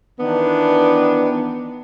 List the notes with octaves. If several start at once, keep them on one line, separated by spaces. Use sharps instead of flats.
D#3 E3 B3 D4